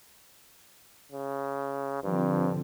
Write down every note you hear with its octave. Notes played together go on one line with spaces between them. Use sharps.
C#3
G2 D3 F3 C4